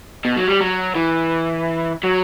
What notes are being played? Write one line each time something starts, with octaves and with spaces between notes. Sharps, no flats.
B2
F#3
G3
F#3
E3
F#3